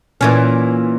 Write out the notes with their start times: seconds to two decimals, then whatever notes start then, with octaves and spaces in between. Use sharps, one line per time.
0.21 A#2 E3 C#4